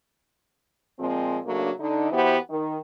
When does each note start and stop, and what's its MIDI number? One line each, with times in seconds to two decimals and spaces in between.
0.99 1.39 46
0.99 1.39 53
0.99 1.39 56
0.99 1.39 60
1.45 1.70 49
1.45 1.70 54
1.45 1.70 57
1.45 1.70 58
1.45 1.70 62
1.79 2.08 50
1.79 2.08 63
2.11 2.37 52
2.11 2.37 59
2.11 2.37 64
2.11 2.37 66
2.11 2.37 67
2.11 2.37 72
2.50 2.78 51